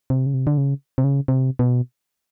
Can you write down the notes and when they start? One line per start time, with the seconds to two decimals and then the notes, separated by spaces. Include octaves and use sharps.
0.10 C3
0.26 C#3
0.34 C3
0.47 D3
0.58 C#3
0.98 C3
1.04 C#3
1.28 C3
1.59 B2